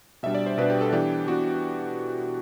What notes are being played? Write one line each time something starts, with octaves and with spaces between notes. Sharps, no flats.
B2 G3 D4 E5
D5
C5
B2 G3 D4 B4
G4
A4
E3 B3 D4 G4
E3 B3 D4 F#4